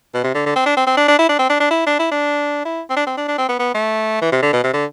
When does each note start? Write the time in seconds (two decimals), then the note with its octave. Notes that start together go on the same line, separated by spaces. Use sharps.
0.14 B2
0.24 C3
0.35 D3
0.46 D3
0.56 C4
0.66 D4
0.77 C4
0.87 C4
0.97 D4
1.08 D4
1.19 E4
1.29 D4
1.39 C4
1.50 D4
1.60 D4
1.70 E4
1.86 D4
1.99 E4
2.11 D4
2.65 E4
2.90 C4
2.97 D4
3.07 C4
3.17 D4
3.28 D4
3.38 C4
3.49 B3
3.59 B3
3.75 A3
4.22 E3
4.32 C3
4.43 D3
4.53 B2
4.64 C3
4.74 D3